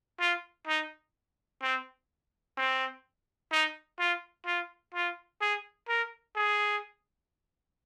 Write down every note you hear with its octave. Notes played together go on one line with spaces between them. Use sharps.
F4
D#4
C4
C4
D#4
F4
F4
F4
G#4
A#4
G#4